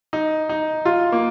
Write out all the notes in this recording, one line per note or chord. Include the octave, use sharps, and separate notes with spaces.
D#4
D#4
F4
A#3